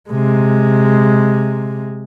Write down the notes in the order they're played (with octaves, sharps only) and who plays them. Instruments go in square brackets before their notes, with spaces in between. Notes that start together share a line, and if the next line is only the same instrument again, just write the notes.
[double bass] C3 G#3